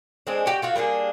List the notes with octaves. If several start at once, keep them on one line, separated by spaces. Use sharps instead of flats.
G#3 C4 D4
F#4 G4 G5
F4 F#4 A4
G3 A#3 D4 G#4